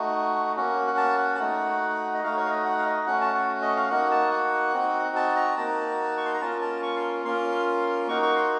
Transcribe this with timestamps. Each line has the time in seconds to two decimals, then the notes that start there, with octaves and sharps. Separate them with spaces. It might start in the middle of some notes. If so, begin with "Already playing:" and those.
Already playing: A3 D#4 F#4
0.56 A#3 C#4 F#4
0.87 F#5
0.97 A5
1.18 F#5
1.35 A5
1.39 A3 D#4 F#4 F#5
2.14 D#5
2.23 A3 D#4 F#4 F5
2.37 C#5
2.46 F5
2.50 D#5
2.65 F#5
2.79 F5
2.86 D#5
3.07 A3 C#4 F#4 F#5
3.21 A5
3.34 F#5
3.62 D#5
3.77 F5
3.90 A#3 D#4 F#4 F#5
4.11 A5
4.31 F#5
4.73 C4 D#4 F#4
5.16 A5
5.36 A#5
5.57 A#3 D#4 F#4 A5
6.17 C#6
6.26 C6
6.34 A#5
6.41 A#3 C#4 F4 A5
6.62 A5
6.83 C#6
6.97 C6
7.24 A#3 C#4 F4 C6
8.08 A#3 D#4 F#4 C#6
8.22 C#6
8.36 C6